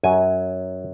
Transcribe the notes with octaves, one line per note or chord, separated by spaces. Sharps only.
F#2 F#3 G#5